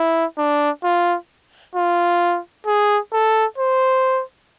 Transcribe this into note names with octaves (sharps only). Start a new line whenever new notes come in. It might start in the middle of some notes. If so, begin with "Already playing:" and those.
Already playing: E4
D4
F4
F4
G#4
A4
C5